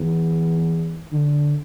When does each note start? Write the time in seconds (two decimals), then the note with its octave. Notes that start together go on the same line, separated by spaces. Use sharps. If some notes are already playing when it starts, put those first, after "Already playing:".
Already playing: E2
1.12 D3